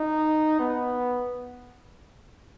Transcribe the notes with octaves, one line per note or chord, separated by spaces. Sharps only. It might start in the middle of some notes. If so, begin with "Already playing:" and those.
Already playing: D#4
B3